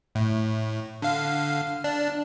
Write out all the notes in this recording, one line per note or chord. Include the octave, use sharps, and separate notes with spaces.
A2
D3 F5
D4